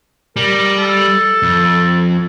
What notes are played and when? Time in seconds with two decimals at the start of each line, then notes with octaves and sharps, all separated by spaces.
0.37 G3 A#4
0.77 A4
1.43 F2